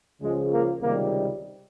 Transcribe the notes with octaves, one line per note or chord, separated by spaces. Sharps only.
C#2 C#3 F3 G#3
A#3
C#2 C3 D#3 G3 A#3